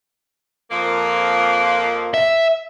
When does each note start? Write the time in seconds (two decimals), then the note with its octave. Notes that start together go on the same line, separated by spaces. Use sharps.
0.71 F2 A#3
2.14 E5